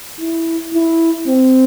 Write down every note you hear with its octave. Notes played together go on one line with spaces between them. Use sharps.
E4
E4
C4